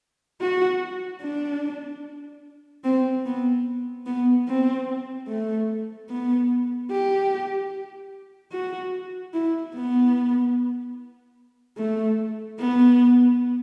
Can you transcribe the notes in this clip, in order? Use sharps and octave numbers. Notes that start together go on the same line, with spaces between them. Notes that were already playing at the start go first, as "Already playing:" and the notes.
F#4
D4
C4
B3
B3
C4
A3
B3
G4
F#4
E4
B3
A3
B3